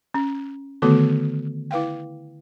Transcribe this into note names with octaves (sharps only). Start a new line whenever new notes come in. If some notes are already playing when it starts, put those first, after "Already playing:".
C#4
D3 D#3 A3 B3 F#4 A4
E4 B4 F5 G5